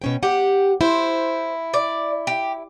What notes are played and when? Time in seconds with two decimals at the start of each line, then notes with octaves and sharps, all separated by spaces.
0.02 B2 C#4 G5
0.23 G4 F#5
0.81 E4 C5
1.74 D5
2.27 G4